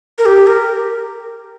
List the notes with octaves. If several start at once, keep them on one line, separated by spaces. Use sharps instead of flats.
A#4
G4
A#4